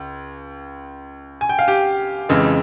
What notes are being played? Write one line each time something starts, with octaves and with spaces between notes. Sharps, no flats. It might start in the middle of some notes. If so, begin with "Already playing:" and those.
Already playing: C#2
G#5
G5
F5
G4 G5
F2 C#3 E3 G#3